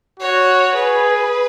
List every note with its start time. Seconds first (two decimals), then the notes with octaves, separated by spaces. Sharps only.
0.20 F#4 C#5
0.75 G#4 B4